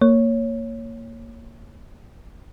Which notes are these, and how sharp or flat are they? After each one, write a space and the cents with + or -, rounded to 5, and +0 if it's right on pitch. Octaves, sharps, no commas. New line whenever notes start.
A#3 -15 C#5 +0